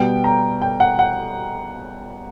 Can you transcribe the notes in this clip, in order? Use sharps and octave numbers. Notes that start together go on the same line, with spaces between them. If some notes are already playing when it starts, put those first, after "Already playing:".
Already playing: B2 G3 B3 G5
A#5
G5
F#5
F#5